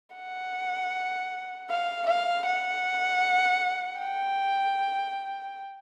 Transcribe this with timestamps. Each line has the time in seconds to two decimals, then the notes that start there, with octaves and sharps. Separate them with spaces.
0.16 F#5
1.70 F5
2.07 F5
2.46 F#5
3.99 G5